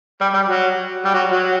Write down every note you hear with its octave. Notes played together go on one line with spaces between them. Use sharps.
G3
G3
F#3
G3
F#3
F#3